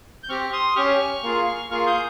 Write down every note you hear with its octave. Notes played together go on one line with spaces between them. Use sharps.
G6
C4 G4 C#6 F6
C6 D#6
C#4 G4 C#6 F6
A#3 F4 G#4
A#3 F4 G#4 C#6 F6
D#6 G6